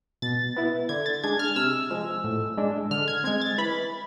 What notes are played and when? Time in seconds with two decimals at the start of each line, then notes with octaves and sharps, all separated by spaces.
0.22 B2 A6
0.56 B3 E4
0.89 D3 G#6
1.06 A6
1.24 G#3 D4 G#6
1.39 F6
1.56 C3 E6
1.91 F3 G#3
2.24 A2
2.57 G#3 D4
2.91 D3 F6
3.08 G#6
3.24 G#3 C4 G#6
3.41 A6
3.58 E3 B5